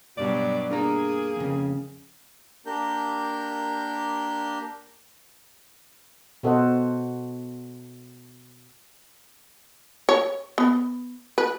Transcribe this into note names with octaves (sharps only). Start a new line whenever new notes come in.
G2 B2 F#3 D5
A#3 D4 G#4 A#5
F2 C#3
A#3 D4 G4 A#4 G6
B2 F#4 A4 C5 D#5 F#5
C#5
B3
B4